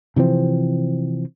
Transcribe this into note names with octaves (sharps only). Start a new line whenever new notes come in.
C3 E3 F3 C4